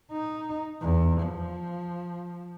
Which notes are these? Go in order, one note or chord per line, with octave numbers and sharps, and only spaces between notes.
D#4
E2
F3